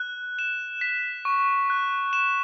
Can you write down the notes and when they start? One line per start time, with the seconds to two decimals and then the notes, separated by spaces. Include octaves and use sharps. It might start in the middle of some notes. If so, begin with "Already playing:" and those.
Already playing: F#6
0.39 E7
0.81 B6
1.25 C#6
1.70 F#6
2.13 E7